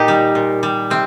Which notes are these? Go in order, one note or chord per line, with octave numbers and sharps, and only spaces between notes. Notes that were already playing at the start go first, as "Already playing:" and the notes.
Already playing: A#2 D#4 G4
G3
A#2
G3
C3 C4